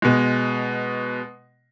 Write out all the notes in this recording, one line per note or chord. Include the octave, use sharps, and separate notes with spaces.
B2 G#3